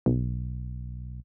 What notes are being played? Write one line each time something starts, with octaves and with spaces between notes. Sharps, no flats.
B1